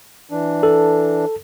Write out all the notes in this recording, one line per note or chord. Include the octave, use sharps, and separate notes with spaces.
E3 D4
A4